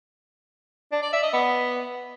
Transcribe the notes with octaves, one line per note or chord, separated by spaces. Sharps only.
D4
D5
E5
D#5
B3